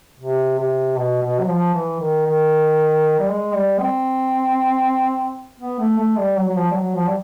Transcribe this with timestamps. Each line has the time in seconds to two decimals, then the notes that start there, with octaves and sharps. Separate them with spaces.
0.20 C3
0.59 C3
0.97 B2
1.23 B2
1.40 F#3
1.49 F3
1.74 E3
2.00 D#3
2.26 D#3
3.19 G3
3.29 G#3
3.54 G3
3.80 C4
5.60 B3
5.79 A3
5.98 A3
6.18 G3
6.37 F#3
6.49 F#3
6.56 F3
6.71 G3
6.75 F#3
6.95 F3
7.07 G3